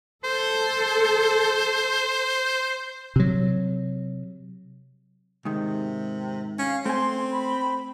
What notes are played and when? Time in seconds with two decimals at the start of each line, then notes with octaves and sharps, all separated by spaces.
0.24 A4 C5
3.16 C3 F#3
5.45 G#2 C3 D#3
6.59 C#4 F5
6.86 A3 C4 G#5 C6
7.31 B5